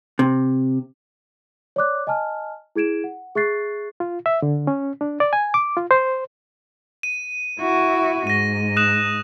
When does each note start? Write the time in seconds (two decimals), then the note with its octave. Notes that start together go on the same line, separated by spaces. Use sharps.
0.19 C3
1.76 C#5 D5 D6 F#6
2.07 D#5 G#5 A5 F6
2.76 E4 G#4 G#6 D7 E7
3.04 F#5
3.35 G#4 E5 C#6 F#6 A6 C7
4.00 F4
4.26 E5
4.42 D3
4.67 C#4
5.01 D4
5.20 D5
5.33 G#5
5.54 D6
5.77 F4
5.91 C5
7.03 D#7
7.60 E4 F#4
8.27 G#2 A#6 D#7
8.76 D#6 F#6 E7